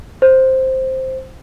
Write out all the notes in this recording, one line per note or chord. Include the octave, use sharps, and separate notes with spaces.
C5